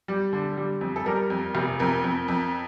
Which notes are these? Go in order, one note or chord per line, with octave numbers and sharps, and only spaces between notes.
G3
D3
G3
F2
A4
G3 A#4
F2
F1
F2 A#4
F2
F2